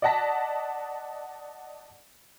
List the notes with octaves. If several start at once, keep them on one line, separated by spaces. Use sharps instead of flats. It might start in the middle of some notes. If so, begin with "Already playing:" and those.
D5 D#5 F#5 A5 A#6 B6